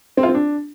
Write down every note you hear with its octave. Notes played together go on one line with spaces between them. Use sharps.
C4
F4
C4
D4